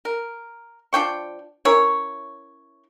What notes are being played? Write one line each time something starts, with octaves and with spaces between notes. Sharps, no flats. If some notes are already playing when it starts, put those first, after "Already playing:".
A#4
F3 D4 G5 C#6
C#4 E4 A#4 C#5